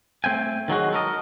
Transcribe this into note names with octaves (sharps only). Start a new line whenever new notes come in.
A3 C4 G5 G#5
D#3 F#3 G#3 F#4
A4 A#4 D#5